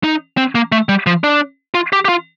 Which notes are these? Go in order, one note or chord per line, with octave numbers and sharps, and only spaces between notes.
D#4
C4
A#3
A3
G3
F3
D4
F4
G4
G4
F4